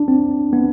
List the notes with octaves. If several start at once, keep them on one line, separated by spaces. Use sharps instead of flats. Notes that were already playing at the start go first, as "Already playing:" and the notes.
Already playing: D4
C4
B3